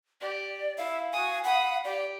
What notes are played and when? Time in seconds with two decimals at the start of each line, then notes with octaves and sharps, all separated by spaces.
0.21 G4 D5
0.78 E4 E5 F5
1.13 F#4 G#5 D#6
1.44 F#5 B5 D#6
1.84 G4 D5